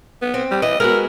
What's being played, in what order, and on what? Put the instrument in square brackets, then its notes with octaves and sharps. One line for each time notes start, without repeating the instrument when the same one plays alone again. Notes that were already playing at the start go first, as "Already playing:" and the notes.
[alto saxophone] B3
[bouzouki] C4
[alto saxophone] G3
[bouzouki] E3 [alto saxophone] D#5
[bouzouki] G#3 B3 F#4 [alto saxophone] A#4